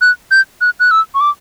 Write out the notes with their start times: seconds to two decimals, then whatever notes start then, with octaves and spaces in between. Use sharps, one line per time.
0.01 F#6
0.31 G6
0.61 F#6
0.80 F#6
0.91 E6
1.15 C#6
1.21 D6